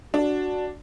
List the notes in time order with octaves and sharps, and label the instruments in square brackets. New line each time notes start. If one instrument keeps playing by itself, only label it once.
[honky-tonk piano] D4 [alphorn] F#4